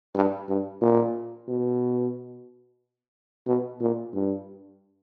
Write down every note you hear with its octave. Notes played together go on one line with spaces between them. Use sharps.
G2
G2
A#2
B2
B2
A#2
G2